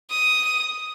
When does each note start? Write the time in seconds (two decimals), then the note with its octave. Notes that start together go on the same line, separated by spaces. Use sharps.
0.10 D#6